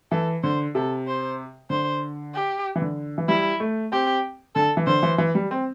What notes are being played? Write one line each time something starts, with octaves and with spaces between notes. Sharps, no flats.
E3 A4
D3 C5
C3 A4
C5
D3 C5
G4
E3
D3
E3
G3 E4
A3
C4 G4
D3 A4
E3
D3 C5
E3
E3
G3
C4